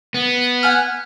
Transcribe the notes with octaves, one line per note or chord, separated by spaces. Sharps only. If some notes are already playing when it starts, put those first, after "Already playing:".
B3
F#5 G#5 F6